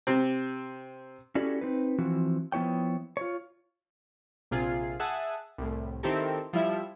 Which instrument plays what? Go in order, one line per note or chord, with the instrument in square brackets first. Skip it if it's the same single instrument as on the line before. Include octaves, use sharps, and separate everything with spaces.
[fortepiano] C3 C4
[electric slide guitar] C#4 E4 F#4 G4 A4 D5
C4 D#4 B4
E3 F3 C4 E4 F#4
F3 B3 E4 C#5 G5
F4 C#5
[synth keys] A#1 C3 F4 G#4 C7
G#4 E5 F#5 A5 D#6
C2 A2
D#3 C4 E4 G4 A4 A#4
F3 G3 E4 E5